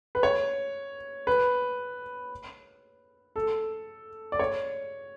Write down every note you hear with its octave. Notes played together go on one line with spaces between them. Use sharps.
B4
C#5
B4
A4
D5
C#5